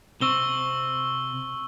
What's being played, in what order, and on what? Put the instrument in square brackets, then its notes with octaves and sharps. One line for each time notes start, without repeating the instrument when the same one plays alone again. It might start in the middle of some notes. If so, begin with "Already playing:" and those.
[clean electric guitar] C3 C4 [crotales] C#6 E6 G7